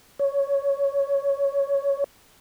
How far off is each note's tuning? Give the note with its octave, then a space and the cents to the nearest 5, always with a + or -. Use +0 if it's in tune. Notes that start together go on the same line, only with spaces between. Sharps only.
C#5 +10